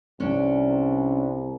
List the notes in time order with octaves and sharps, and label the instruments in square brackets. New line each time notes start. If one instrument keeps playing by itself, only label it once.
[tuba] C2 [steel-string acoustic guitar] C#4 D4